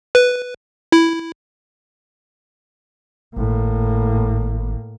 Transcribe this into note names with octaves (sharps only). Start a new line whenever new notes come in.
B4
E4
G#1 A2 A#3